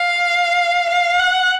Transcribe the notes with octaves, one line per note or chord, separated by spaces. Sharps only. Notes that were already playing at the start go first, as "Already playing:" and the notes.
Already playing: F5
F5
F#5